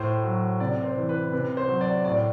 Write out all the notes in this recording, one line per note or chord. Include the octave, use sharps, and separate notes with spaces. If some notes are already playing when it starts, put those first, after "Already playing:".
Already playing: A2 C5
F#3
C3 D5
C5
E3
B4
C3 B4
C5
F#3
D5
A2 D5